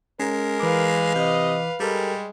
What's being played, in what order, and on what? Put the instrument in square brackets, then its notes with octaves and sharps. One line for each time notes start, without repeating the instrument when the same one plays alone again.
[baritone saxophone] G#3 [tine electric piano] C#4 [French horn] A#4
[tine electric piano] E3 D6 [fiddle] B4 F5
[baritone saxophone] C3 [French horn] D#5
[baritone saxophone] G3 [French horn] G#3 [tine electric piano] G4 A4 A#4